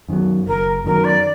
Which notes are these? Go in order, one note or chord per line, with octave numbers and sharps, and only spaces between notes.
F#2 D#3 F#3
F#1 A#4
F#2 D#3 F#3 A#4
D5